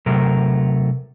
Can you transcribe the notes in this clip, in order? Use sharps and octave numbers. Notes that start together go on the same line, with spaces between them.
C3 F#3 A3 A#4